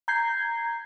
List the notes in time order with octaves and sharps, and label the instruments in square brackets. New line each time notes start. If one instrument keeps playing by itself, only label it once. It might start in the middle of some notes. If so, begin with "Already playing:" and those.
[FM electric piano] A#5 G6 G#6 C7